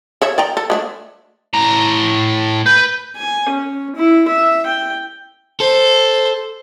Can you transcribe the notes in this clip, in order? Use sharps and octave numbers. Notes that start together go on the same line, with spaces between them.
A4 C#5 E5
D5 G5 A#5
A4
G#3 A3 D4
A2 A#5
B4 G6
G#5
C#4
E4
E5
G5
A4 C5